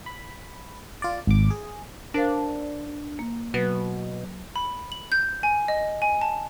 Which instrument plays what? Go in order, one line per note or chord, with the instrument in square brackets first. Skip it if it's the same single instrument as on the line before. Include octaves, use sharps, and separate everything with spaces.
[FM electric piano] B5
F4 D5
G#1 D6
G#4
[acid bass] D4 [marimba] A#4 C5 F5
[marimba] A#3
[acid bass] B2 [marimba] F#3 B4
[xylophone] B5
F#7
G6
G#5
D#5
G#5
A5